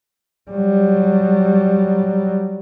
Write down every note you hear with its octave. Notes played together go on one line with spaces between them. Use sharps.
F#3 G3